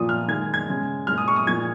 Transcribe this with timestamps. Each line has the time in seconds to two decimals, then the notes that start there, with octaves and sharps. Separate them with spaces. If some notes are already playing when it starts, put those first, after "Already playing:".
Already playing: A#2 F3 A#3 D#6
0.09 F6
0.28 D#3 G#3 G#6
0.54 G#6
0.68 C#3 G#3
1.07 A#2 G#3 F6
1.18 D#6
1.28 C#6
1.36 D#6
1.47 A#2 F3 G#3 G#6